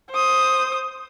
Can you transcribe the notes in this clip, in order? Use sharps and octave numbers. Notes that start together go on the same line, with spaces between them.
C5 D#6